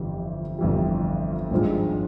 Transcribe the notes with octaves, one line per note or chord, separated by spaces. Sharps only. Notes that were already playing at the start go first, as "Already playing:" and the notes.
Already playing: G1 F2 E3 G3
G1 F2 E3 G3
G#1 G2 F3 G#3